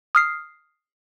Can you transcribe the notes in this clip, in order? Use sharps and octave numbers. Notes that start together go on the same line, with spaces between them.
D#6 F6 C7